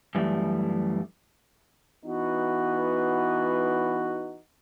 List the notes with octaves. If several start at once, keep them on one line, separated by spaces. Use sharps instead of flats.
F#2 E3 G3 A3
E3 B3 D#4 F#4